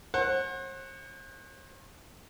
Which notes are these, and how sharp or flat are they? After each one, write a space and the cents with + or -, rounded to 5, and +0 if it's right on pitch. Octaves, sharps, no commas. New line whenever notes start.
C5 +45 F#5 +0